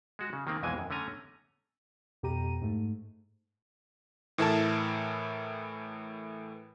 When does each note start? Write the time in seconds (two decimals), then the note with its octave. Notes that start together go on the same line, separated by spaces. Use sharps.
0.19 G#3 F#4
0.33 C#3
0.47 D#3 A#3 C4
0.63 B1 F2 B2 E3 G#3 G#5
0.78 F#2
0.90 D3 A3 C#4 G#5 A#5
2.23 F2 B2 G4 A#5 D#7
2.62 G#2 A3
4.38 A2 E3 E4 A4 A#4 A5